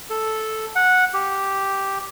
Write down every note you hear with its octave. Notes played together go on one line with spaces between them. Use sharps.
A4
F#5
G4